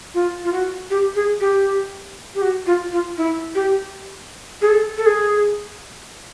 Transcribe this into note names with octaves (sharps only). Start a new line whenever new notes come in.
F4
F4
F#4
G4
G#4
G4
G4
F#4
F4
F4
E4
G4
G#4
A4
A4
G#4